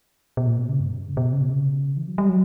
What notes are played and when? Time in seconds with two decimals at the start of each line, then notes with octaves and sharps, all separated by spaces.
0.37 B2
0.47 A#2
0.59 B2
0.69 C#3
0.80 G2
0.90 F#2
1.01 G2
1.09 C#3
1.17 B2
1.33 C#3
1.41 B2
1.50 C#3
1.97 E3
2.08 F#3
2.18 G3
2.29 F#3